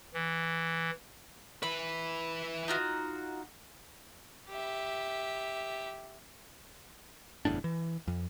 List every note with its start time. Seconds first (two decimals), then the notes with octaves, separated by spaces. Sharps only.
0.14 E3
1.63 E4 B4 B5
2.68 D#4 F4 F#4
4.49 G4 E5
7.45 F#1 E2 A2 D4
7.64 E3
8.08 F2